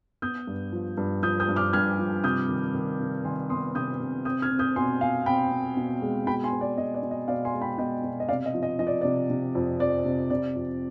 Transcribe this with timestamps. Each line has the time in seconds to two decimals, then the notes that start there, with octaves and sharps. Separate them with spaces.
0.22 B3 D#6 G6
0.47 G2
0.72 F3
0.98 G2
1.23 F3 D#6 G6
1.40 D#6 G6
1.49 G2
1.56 D6 F6
1.73 G2 F6 G#6
1.99 F3
2.24 C3 D#6 G6
2.49 D#3
2.74 D#3
3.00 C3
3.24 D#3 G#5 C6
3.50 B3 C6 D#6
3.75 C3 D#6 G6
4.00 C3
4.25 C4 D#6 G6
4.42 F6 G#6
4.51 C4
4.59 D#6 G6
4.76 B2 G#5 C6
5.01 C4 F5 G#5
5.26 C4 G5 B5
5.52 C4
5.77 B2
6.02 G#3
6.27 B2 G5 B5
6.44 G#5 C6
6.52 B2
6.61 D5
6.78 B2 D#5
6.94 D5
7.03 B2
7.11 D#5
7.28 B2 D5 F5
7.45 G#5 C6
7.54 G#3
7.62 G5 B5
7.78 B2 D#5 G5
8.04 B2
8.20 D#5
8.29 C3 D5 F5
8.46 D#5
8.54 F3
8.63 D#5
8.79 F3 D#5
8.87 D5
9.01 C3 D5
9.30 C3
9.55 F2
9.80 F2 D5
10.05 C3
10.30 C3 D5
10.56 F2